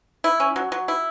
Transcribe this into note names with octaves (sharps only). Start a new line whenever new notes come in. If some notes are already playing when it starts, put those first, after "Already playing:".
E4
C#4
F#3
F#3
E4